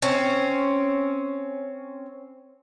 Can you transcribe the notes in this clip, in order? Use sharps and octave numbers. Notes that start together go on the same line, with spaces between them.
C4 C#4